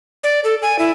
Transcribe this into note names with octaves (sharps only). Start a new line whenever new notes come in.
D5
A4
G#5
E4